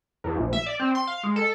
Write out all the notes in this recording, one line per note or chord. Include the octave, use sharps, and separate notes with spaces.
E2
A#1
E5
D5
C4
C6
F5
G#3
A4